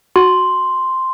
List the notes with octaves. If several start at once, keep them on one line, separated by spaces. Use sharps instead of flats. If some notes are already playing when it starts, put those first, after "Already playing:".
F#4 C6